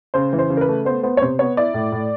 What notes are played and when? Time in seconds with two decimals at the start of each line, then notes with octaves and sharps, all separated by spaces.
0.14 C#3 C5
0.33 E3
0.39 C5
0.50 C#3
0.57 A#4
0.61 B4
0.68 A3
0.85 B3 C5
1.03 B3 C5
1.17 C#5
1.21 C3 C5
1.39 B3 C#5
1.57 E4 D5
1.74 A2
1.92 A2